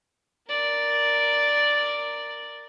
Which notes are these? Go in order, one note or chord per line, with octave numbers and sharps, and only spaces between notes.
A#4 D5